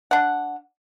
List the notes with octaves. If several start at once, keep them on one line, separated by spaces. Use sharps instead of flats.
D4 F#5